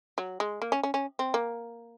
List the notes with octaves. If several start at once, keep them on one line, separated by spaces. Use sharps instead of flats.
F#3
G#3
A#3
C#4
C#4
C#4
C4
A#3